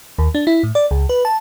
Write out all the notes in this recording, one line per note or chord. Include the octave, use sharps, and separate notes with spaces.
D#2
D4
E4
A2
D5
C#2
B4
A5